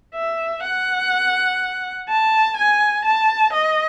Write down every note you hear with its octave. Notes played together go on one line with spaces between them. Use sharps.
E5
F#5
A5
G#5
A5
D#5